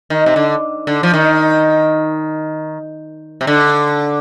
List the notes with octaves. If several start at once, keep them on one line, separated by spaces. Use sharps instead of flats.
D#3
C3
D3
D3
F3
D#3
C3
D3